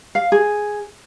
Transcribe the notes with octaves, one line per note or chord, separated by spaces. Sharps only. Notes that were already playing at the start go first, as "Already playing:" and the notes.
F5
G#4